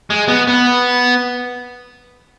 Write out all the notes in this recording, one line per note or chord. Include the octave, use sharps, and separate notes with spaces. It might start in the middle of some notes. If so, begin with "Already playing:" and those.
G#3
B3
B3